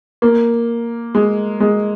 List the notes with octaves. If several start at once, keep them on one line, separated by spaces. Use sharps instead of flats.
A#3
G#3
G#3